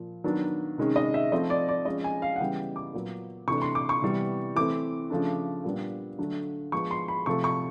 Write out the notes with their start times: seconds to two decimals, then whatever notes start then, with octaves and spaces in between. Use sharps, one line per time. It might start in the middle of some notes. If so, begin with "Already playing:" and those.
Already playing: A#2 F3
0.24 D#3 F#3 B3 D4
0.78 C3 D#3 G#3 C#4
0.96 D#5
1.14 E5
1.32 F3 A3 C4 D#5
1.50 D5
1.69 D5
1.85 F3 G#3 C#4 D#5
2.04 G#5
2.22 F5
2.36 F#5
2.40 C#3 E3 G3 B3 G5
2.76 D6
2.94 A#2 F#3 B3
3.48 C3 E3 A3 D4 C#6
3.62 C6
3.75 D6
3.89 C#6
4.02 C3 E3 G3 B3
4.56 E3 A3 C4 D6
5.10 C#3 F3 A3 D4
5.64 A#2 G3 B3 D4
6.18 D3 F#3 A3 D4
6.72 F3 G#3 B3 C#6
6.91 C6
7.08 B5
7.26 C3 F3 A3 C#6
7.44 C#6